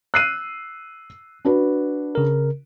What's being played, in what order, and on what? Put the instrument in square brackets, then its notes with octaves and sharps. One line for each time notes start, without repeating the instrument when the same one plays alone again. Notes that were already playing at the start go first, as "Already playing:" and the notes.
[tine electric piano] E6 [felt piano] F#6 C7 D#7
[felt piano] D4 F#4 B4
[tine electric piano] C#3 A#4